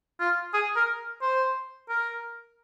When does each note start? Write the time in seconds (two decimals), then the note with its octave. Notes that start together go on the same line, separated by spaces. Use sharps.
0.20 F4
0.53 G#4
0.76 A#4
1.21 C5
1.89 A#4